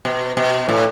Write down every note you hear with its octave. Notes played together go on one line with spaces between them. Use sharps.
B2
B2
A2